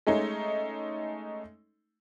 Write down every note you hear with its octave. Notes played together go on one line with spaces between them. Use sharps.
G#3 A3 C#4 D#4